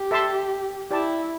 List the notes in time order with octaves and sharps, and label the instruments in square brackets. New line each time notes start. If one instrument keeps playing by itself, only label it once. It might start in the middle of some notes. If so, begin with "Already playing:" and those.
Already playing: [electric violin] G4
[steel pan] A4 E5 A5 C6
[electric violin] E4 [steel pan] G4 D5 A5